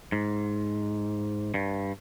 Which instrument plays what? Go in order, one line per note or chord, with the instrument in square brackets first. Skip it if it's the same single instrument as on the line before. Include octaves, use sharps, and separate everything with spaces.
[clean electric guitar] G#2
G2